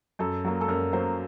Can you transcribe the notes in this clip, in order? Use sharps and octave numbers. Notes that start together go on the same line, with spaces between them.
F#2 A4
F#3 A#3
A4
F#2 A#4
F#3 A#3 C5